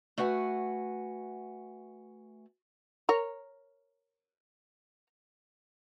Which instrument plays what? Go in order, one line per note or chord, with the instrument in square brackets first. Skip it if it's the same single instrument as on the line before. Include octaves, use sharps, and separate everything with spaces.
[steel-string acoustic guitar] A3 F#4 B4 F#5 G#5
[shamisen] A#4 C#5